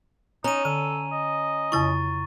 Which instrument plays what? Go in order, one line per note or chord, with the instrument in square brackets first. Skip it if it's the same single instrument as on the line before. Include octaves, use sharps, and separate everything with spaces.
[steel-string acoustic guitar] C#4 [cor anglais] D#4 [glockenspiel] A#5 D#7
[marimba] D3 [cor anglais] A4 [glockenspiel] D#7
[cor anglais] D#5
[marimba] F2 C#3 E4 [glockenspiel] C#6 A6